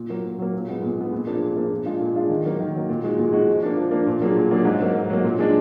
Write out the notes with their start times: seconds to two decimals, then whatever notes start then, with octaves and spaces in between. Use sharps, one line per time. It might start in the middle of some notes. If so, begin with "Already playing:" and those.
Already playing: A#2
0.09 F#3 A#3
0.24 A#2
0.38 F#3 A#3
0.54 A#2
0.67 G#3 B3
0.82 A#2
0.97 G#3 B3
1.12 A#2
1.27 F3 A#3 D4 G#4
1.42 A#2
1.56 F3 A#3 D4 G#4
1.71 A#2
1.85 G#3 D4 F4 G#4
2.00 A#2
2.15 G#3 D4 F4 G#4
2.29 D#3
2.45 F#3 A#3
2.60 D#3
2.74 F#3 A#3
2.89 A#2
3.03 G#3 D#4 F#4
3.18 A#2
3.32 G#3 D#4 F#4
3.47 F3
3.63 A#3 D4
3.77 F3
3.91 A#3 D4
4.06 A#2
4.21 F#3 A#3 D4 G#4
4.36 A#2
4.50 F#3 A#3 D4 G#4
4.65 G#2
4.80 F#3 A#3
4.95 G#2
5.09 F#3 A#3
5.24 A#2
5.39 G#3 D4